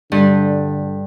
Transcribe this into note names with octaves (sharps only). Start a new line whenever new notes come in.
G2 D3